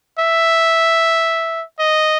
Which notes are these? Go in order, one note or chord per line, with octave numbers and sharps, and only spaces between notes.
E5
D#5